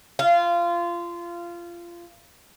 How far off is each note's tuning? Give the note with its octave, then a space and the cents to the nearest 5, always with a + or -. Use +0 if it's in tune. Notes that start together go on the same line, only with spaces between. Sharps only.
F4 -20